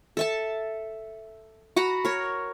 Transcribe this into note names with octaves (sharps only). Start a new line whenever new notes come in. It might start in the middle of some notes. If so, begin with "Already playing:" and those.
A4 E5 A5
F#4 F#5 A#5 B5
A#4 C#5